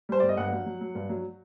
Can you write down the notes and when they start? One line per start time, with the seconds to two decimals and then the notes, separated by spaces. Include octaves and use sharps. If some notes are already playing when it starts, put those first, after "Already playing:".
0.09 G3 C5
0.20 G1 D5
0.29 D#5
0.37 G2 F#5
0.52 F#3
0.66 F#3
0.81 F#3
0.95 G2
1.09 F#3